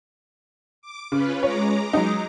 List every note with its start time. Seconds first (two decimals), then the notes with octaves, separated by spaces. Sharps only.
0.82 D6
1.12 C#3 C#4 F4 B4
1.43 G#3 C#5 A#5 D6
1.93 F#3 D#4